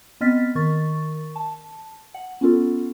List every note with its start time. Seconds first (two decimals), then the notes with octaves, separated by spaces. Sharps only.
0.21 B3 C4 D#5 F6 A6 B6
0.55 D#3 A#4 C#6 A6
1.36 A5
2.15 F#5
2.41 B3 C#4 F4 A4